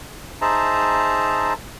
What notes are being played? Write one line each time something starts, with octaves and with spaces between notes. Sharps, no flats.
D#4 G#4 C5 E5 A5 A#5